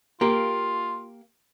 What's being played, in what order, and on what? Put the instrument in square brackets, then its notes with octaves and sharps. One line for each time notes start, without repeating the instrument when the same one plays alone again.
[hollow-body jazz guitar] A#3 G4 [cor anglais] F4